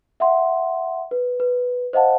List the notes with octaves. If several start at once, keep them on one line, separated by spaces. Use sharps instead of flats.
E5 F#5 C6
B4
B4
C5 D#5 F5 F#5 A5